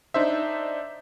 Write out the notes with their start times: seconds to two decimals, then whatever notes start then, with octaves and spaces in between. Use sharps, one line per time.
0.14 D4 D#4 C5 E5